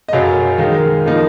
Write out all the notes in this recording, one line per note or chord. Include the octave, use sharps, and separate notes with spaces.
D#5
F#2 C#3 F#3 F5
D#3 G#3 D#4 F5
C#3 F3 A#3 D#4